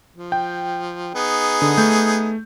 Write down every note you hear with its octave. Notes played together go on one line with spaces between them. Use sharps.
F3
G5
B3 D#4 G#4
D3
A3 G6